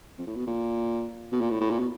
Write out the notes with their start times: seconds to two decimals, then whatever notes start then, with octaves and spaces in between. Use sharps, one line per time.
0.18 F2
0.27 A2
0.36 B2
0.47 A#2
1.32 B2
1.41 A#2
1.50 A2
1.61 A2
1.70 A#2
1.79 B2